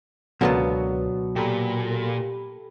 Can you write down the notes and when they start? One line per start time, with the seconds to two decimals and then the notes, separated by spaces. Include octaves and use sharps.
0.41 C#2 B2 D3 F#3 A#3 B3 F4
1.36 A#2 G4 A4 B5